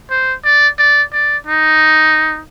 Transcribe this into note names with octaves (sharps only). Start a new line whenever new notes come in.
C5
D5
D5
D5
D#4